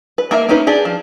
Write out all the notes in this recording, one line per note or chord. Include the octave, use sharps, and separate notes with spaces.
B4
A#3 A#4 E5
A#3 C#4 D#4 G4 B4
D4 G4 G#4
F3